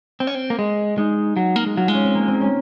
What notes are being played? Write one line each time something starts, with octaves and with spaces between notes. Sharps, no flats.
C4
C#4
C4
A#3
G#3
G#3 D#4
F#3
A#3
G#3
F#3 F4
G#3 F4
C#4
C4
A#3
C4
C#4